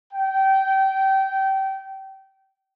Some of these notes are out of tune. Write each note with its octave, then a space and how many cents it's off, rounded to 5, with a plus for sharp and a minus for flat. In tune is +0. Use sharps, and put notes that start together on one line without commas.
G5 -25